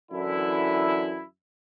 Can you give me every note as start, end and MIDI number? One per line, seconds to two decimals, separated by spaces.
0.12 1.24 42
0.12 1.24 50
0.12 1.24 52
0.12 1.24 64